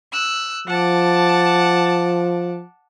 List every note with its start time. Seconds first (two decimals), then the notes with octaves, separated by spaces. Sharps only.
0.10 E6 F#6
0.68 F3 F#5 A5 D6